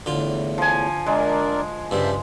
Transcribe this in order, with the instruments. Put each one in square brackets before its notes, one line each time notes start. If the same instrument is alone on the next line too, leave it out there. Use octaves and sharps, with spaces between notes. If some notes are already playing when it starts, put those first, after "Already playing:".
[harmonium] E2 A2 [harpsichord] D3 F4
[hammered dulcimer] F3 G#5
[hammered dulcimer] G#3 [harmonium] D4 A#4 D5
[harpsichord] G2 C#3 G3 [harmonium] C5 E5 A5